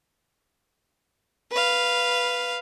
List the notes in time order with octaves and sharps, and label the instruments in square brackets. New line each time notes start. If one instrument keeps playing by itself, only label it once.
[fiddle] B4 F5